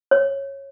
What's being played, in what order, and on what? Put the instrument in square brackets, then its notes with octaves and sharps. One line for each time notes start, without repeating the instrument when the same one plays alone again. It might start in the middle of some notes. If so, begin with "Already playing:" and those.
[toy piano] C#5